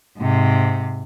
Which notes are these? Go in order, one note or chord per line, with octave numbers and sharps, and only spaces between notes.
G#2 C3